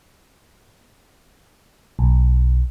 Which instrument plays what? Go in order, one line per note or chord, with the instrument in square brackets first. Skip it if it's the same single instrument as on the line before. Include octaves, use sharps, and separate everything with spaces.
[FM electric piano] B1